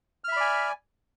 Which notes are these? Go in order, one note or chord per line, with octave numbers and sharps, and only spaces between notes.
D5 E5 G#5 B5 F6